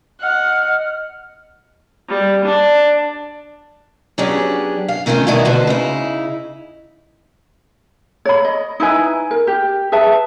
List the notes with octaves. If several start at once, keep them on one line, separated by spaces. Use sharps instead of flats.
D#5 F#5 F6
G3
D4
F#3 B3 C#4 D4 G4 G#4
F5
C3 D#3 A3 C#4 F4
G2 B2 D#3 E4 F#4
D2 B2 D3 F#4 B4 C5
C#3 D#4 E4
C#5 B5
D#5
D#4 E4 B4 G#5
A#4
G4
G#4 B4 E5 A5